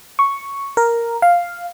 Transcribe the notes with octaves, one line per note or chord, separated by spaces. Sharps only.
C#6
A#4
F5